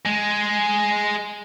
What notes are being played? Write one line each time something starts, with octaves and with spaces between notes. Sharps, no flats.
G#3